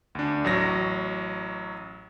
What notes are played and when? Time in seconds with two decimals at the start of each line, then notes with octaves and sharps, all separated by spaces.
0.15 D2 D4
0.45 A1 F#3 A#6